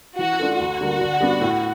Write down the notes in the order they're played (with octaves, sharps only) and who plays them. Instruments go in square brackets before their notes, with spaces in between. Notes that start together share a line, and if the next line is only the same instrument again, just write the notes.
[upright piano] E3 [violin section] F#4
[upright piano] A3 D4 F4 A4
[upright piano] D2 [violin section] F#4
[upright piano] D3 G3 A#3
D3
G3 B3 D4
A2